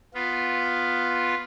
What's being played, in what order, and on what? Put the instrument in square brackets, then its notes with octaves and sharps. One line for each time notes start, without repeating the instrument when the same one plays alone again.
[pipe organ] B3 F4